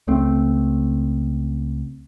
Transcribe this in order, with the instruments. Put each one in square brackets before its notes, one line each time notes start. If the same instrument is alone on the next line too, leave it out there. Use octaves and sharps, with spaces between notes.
[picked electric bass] C#2 A3 C4